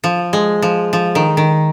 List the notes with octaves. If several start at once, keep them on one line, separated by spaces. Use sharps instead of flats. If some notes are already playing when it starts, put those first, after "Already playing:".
F3
G#3
F3
F3
D#3
D#3